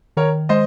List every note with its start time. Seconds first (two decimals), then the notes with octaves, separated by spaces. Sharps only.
0.17 D#3 A#4 C#5
0.49 G#3 C5 D#5